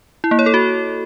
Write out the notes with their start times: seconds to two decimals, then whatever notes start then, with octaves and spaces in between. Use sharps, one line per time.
0.24 E4
0.31 A#3
0.39 C#5
0.46 A4
0.54 F#4